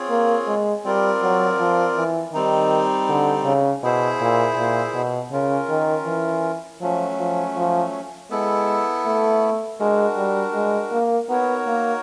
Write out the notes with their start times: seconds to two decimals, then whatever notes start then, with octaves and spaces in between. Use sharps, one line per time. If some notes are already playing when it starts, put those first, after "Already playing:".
Already playing: C4 F4 G#4 C#5
0.10 A#3
0.47 G#3
0.84 G3 C4 F4 A#4 D5
1.22 F#3
1.59 F3
1.97 E3
2.33 D#3 G3 C4 D#4
3.09 D3
3.45 C#3
3.83 B2 E4 G#4 C5 E5
4.21 A#2
4.57 A#2
4.94 B2
5.32 C#3 C#4 F4 A#4
5.70 D#3
6.06 E3
6.81 F3 F#3 A3 C#4
7.18 F3
7.56 F3
8.30 G#3 B3 E4 A4
9.05 A3
9.79 G#3 D4 F#4 A#4
10.17 G3
10.54 G#3
10.92 A#3
11.28 B3 D#4 F#4 A#4 C#5
11.67 A#3